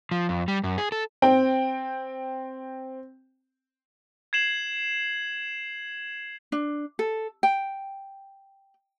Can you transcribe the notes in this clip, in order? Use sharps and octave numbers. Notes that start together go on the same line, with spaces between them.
F3
F2
G3
F#2
G#4
A4
C4 G5
G#6 C7 E7 F#7
D4
A4
G5